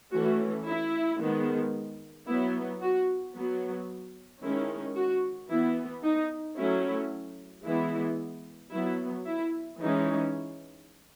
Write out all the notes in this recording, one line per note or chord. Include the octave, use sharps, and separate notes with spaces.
E3 A3 C#4 F#4
E4
D#3 G#3 B3
F#3 B3 E4
F#4
F#3 B3
D#3 G#3 C#4 E4
F#4
E3 B3 E4
D#4
F#3 A3 C#4 E4
E3 G#3 B3 E4
F#3 B3 E4
E4
E3 G#3 C#4 D#4